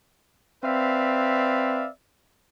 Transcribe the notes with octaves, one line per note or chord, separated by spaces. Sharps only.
C4 B4 D5 E5 F5